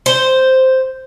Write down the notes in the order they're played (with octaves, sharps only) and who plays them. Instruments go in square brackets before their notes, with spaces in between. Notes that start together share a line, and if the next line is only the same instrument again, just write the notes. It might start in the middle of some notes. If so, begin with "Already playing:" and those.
[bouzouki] C5